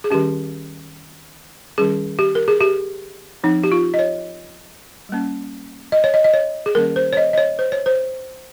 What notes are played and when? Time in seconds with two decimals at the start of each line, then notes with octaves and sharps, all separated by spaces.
0.04 G#4
0.10 D#3 G3 C#4 G4
1.78 D#3 G3 C#4 G#4
2.19 G4
2.35 A#4
2.48 G#4
2.61 G4
3.44 F3 C4 D#4
3.64 G4
3.72 F4
3.94 D#5
3.99 C#5
5.09 G3 A#3 C#4
5.92 D#5
6.04 C#5
6.14 D#5
6.24 D#5
6.34 C#5
6.66 G#4
6.75 D#3 G3 A#3 C#4 A#4
6.96 C5
7.13 C#5
7.17 D#5
7.33 D#5
7.38 C#5
7.59 C5
7.72 C#5
7.86 C5